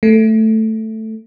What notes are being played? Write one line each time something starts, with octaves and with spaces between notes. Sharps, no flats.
A3